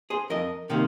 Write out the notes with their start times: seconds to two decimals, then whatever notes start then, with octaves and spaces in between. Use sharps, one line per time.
0.10 G#4 C5
0.30 F2 A#4 D#5
0.70 C3 D#3 A#3